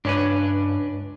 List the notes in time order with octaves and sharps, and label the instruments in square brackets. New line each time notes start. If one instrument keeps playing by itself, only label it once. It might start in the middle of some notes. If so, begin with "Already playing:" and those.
[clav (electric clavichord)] C#2 C#4 B4 [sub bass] G2 [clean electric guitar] D4